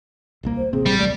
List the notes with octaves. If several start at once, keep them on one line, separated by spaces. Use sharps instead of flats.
D#1 C2 A#3
C5
A1 C3 C4 G#4
G3
D#1 C2 A3 D5